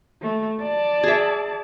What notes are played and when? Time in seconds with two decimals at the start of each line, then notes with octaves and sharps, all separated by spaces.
0.22 A3
0.61 D5 A5
1.03 G#4 E5